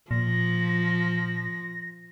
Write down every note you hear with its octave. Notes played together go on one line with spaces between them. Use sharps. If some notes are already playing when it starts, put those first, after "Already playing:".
A#2 F3 A#6